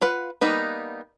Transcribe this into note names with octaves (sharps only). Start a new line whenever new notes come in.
F4 B4 F#5
G3 A#3 B3 D#4 B4